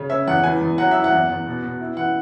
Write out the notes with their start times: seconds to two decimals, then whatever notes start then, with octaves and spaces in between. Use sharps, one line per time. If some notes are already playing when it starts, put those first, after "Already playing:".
Already playing: C#3
0.10 C#4 E5
0.28 E2 F#5
0.44 E3 G#5
0.61 E2
0.78 F#3 F#5
0.91 E4 E5
1.04 F#5
1.12 E2
1.30 E2
1.46 B2
1.63 B2
1.81 E4
1.97 E3 F#5